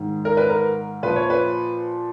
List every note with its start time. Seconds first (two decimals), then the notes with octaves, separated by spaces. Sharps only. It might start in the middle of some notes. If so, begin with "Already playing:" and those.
Already playing: G#2 D#3
0.25 A#4
0.37 B4
0.50 A#4
1.03 A#2 F3 B4
1.16 C#5
1.30 B4